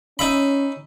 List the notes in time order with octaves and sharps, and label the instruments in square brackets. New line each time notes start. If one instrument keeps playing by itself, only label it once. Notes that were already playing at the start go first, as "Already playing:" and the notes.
[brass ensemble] C#4 [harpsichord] D#4 E5 B5